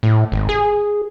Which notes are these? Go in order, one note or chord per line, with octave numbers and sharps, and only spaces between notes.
A2
G#1
G#4